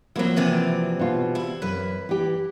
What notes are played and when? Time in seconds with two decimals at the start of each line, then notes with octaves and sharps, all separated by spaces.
0.16 F3 F#3 A#3 C4 E4
0.36 C3 E3 D5
0.99 B2 F4
1.35 E4
1.62 F#2 B4
2.09 E3 G4